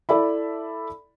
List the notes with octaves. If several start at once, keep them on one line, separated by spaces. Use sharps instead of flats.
E4 A4 D5 E5 B5